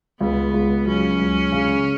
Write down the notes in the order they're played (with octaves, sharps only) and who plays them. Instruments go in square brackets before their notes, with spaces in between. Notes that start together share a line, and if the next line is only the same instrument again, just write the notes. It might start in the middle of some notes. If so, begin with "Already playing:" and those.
[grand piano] C#2 [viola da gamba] B3
[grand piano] C#2
[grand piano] F#3 [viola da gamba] C#4
[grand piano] C#2
C#3